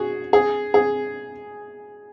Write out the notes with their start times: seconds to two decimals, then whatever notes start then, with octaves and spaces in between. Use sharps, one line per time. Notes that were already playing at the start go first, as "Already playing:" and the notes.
Already playing: F#4 G#4
0.33 G#4
0.74 G#4